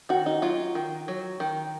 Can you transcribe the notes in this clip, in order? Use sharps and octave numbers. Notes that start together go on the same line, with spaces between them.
D#3 F#4
D#4
F#3 F4
D#3
F#3
D#3